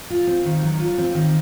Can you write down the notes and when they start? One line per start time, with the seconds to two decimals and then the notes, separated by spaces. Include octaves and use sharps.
0.10 F4
0.27 C4
0.45 D#3
0.63 F#3
0.80 F4
0.98 C4
1.15 D#3